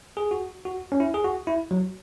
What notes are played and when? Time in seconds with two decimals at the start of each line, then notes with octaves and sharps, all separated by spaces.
0.17 G#4
0.31 F#4
0.65 F#4
0.92 C#4
1.00 E4
1.14 G#4
1.25 F#4
1.47 E4
1.71 F#3